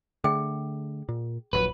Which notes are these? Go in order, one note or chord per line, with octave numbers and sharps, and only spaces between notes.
D3 A3 G#4 G5
A#2
D#1 A#1 F#3 B4